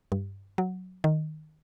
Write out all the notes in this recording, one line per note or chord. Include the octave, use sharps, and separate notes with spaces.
G2
F#3
D#3